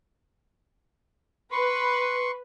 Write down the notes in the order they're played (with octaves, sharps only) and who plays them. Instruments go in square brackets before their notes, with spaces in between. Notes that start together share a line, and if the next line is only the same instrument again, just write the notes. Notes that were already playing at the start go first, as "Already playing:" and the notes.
[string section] B4 [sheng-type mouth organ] C6 C#6